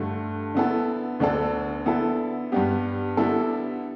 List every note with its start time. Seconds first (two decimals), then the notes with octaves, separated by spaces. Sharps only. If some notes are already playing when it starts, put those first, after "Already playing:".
Already playing: G2 D3 A3
0.55 D3 B3 E4 A4
1.20 D2 D3 B3 D4 A4
1.86 D3 B3 E4 A4
2.52 G2 G3 B3 G4
3.17 D3 G3 B3 E4 A4